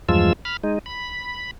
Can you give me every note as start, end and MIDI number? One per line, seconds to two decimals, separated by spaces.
0.09 0.33 40
0.09 0.33 43
0.09 0.33 53
0.09 0.33 56
0.09 0.33 65
0.09 0.33 88
0.45 0.57 83
0.45 0.57 89
0.64 0.79 56
0.64 0.79 63
0.86 1.51 83